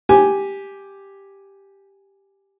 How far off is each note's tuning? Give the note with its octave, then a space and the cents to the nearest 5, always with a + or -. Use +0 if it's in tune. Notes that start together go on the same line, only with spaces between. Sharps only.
G4 +0 G#5 +0